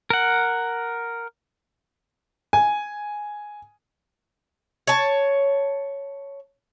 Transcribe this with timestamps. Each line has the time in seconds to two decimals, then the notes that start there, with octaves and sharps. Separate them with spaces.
0.10 A#4 F#5
2.53 G#5
4.87 C#5 A5